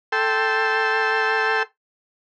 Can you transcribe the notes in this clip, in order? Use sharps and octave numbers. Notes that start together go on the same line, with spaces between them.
A4 G5 C6 E6